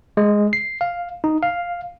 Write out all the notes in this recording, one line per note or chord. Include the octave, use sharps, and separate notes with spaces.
G#3
C7
F5
D#4
F5